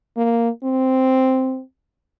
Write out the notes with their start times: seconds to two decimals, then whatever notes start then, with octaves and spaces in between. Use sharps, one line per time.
0.17 A#3
0.64 C4